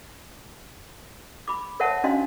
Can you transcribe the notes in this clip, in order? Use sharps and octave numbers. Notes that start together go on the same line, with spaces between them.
B5 D6
A#4 C5 C#5 E5 F#5 A5
C#4 D4 F#4 D#5 F5 C6